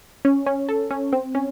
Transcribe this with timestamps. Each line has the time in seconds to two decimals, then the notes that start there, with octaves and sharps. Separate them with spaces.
0.25 C#4
0.46 C#4
0.69 A4
0.91 C#4
1.12 C4
1.35 C#4